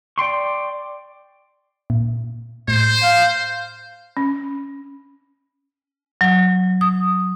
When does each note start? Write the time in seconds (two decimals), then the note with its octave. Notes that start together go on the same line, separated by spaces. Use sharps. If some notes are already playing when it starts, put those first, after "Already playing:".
0.18 D5 G5 C6 C#6
1.90 A#2
2.68 A2 C5
3.03 F5
4.17 C#4
6.21 F#3
6.81 D#6